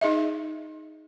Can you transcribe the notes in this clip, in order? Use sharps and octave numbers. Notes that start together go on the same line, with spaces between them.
D#4 G#4 D#5 E5